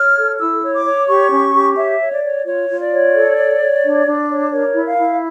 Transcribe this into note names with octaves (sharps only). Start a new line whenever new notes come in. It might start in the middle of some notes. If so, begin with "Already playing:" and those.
Already playing: C#5 F6
A4
E4 E6
C#5
D6
C#5
G4 C#6
C#4
G4
C#5 E5
C#5
D5
C#5
F4 C#5
F4
D5
C#5
A4
C#5
C#5
D4
D4
C#5
A#4 C#5
E4
F5
E4